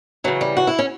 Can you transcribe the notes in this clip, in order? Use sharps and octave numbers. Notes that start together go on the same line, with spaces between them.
C#3 E3 F#3
G3
F#4
E4
C#4